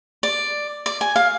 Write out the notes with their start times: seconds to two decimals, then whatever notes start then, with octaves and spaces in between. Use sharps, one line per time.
0.23 D5
0.86 D5
1.01 G#5
1.16 F5